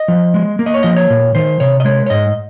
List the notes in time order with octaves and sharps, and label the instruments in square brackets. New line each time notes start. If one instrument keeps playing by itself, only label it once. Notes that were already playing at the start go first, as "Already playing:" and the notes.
Already playing: [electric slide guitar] D#5
F3
G#3
A#3
D#5
C#5
F3 D#5
C#5
A#2
D#3 C5
C3 C#5
D#5
G#3 C#5
C#5
G#2 D#5